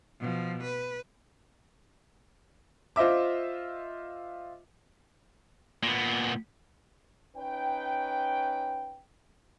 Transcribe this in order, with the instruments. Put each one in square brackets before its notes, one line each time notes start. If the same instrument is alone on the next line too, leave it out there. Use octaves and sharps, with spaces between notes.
[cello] B2 F3
B4
[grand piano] F4 C5 D#5 E5 D6
[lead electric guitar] A#2 B3
[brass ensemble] C#4 D#4 B4 C#5 G5